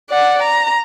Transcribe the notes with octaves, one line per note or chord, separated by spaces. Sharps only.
D5 F#5
A#5